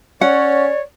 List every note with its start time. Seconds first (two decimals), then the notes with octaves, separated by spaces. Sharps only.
0.21 C#4 C#5 D5 F#5